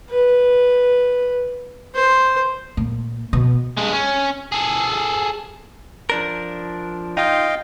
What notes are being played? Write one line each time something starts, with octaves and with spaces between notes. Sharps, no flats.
B4
C5
A#2
B2
G2 G#3
C#4
G#4 A4
F3 D4 A#4
D#4 F4 D#5 F5 G5